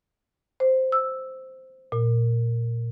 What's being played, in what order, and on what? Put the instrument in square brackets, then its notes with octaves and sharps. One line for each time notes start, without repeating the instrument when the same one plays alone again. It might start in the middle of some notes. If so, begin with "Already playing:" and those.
[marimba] C5
E6
A#2